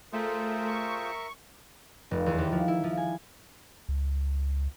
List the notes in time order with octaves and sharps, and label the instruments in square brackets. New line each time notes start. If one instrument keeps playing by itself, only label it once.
[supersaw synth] A3 [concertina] F4 G#4 C5 [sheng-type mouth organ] A#4 E5
[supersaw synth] C#6
[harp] F1
E2
D#2
F3
E4
F3
G#5
[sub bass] C#2